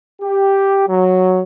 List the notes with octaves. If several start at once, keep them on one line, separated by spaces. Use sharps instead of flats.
G4
F#3